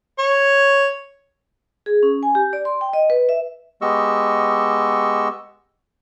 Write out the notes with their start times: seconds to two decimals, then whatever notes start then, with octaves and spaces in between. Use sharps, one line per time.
0.19 C#5
1.86 G#4
2.03 C#4
2.23 G#5
2.35 G4
2.53 D5
2.65 C6
2.81 G5
2.93 D#5
3.10 B4
3.29 E5
3.82 G#3 B3 G4 D#5 C#6 E6